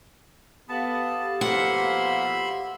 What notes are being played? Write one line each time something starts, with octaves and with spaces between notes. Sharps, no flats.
B3 G4 A4 F5 A5
B2 F3 A#3 E5 F#5 B5 C6